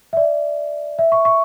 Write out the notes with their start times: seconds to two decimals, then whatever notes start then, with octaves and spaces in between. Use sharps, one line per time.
0.13 E5
0.17 D5
0.99 E5
1.12 C#6
1.25 C#6